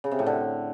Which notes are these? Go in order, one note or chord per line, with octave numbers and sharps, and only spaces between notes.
C#3
C3
A2
D3